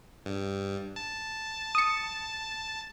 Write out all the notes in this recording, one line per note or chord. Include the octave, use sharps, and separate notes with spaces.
G2
A5
D#6 C#7